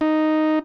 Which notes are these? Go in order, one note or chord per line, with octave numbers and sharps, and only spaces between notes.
D#4